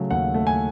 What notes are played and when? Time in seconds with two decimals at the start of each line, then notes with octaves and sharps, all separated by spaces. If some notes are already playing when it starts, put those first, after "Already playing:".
Already playing: C#3 F#3 A3
0.11 D#2 F#5
0.34 A3
0.47 G#5